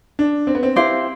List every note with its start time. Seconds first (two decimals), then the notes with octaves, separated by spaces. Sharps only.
0.19 D4
0.47 C4
0.55 B3
0.63 C4
0.76 C4 E4 G4 C5 F5